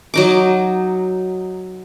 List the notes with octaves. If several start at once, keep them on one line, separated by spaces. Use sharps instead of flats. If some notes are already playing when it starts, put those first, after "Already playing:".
F#3 D#4 D6